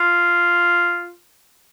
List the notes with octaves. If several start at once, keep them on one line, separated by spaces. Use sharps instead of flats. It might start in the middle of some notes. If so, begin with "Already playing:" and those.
Already playing: F4